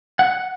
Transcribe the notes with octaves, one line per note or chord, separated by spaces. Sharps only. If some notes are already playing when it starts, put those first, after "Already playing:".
F#5